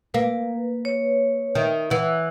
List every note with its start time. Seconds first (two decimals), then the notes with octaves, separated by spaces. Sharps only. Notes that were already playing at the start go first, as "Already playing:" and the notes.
0.14 A#3 B4
0.85 C#5
1.55 D#3 E5
1.90 E3 F#5